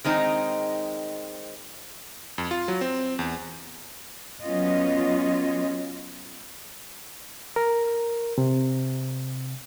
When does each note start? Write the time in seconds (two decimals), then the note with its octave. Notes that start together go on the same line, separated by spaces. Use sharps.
0.04 D#3 G#3 C4 D#4
2.38 F2
2.51 F4
2.68 F#3
2.81 C4
3.19 E2
4.43 F#3 B3 C#4 F4 D#5
7.56 A#4
8.38 C3